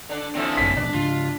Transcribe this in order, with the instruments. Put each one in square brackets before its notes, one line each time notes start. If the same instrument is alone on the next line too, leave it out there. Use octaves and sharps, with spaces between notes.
[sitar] D3 D4
[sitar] D3 F3 E4 [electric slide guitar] C4 C#4 E5
[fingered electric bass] G#1 F#2 [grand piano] B6
[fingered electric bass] B2 F3 A3 [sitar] D4
[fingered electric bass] G#2 C#3 [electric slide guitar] F4